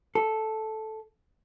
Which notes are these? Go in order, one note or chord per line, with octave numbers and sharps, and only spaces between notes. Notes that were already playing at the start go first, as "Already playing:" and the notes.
A4